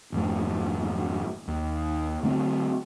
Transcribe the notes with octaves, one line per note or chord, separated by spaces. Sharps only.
G#1 F2 A3
D#2
D3 A3 B3 C4